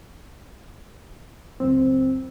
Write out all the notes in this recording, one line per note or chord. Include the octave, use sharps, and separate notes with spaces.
C#2 F#2 C4